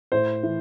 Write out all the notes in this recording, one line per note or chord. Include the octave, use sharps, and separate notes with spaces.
A2 C5
E3